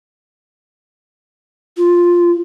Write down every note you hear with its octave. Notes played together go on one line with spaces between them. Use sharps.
F4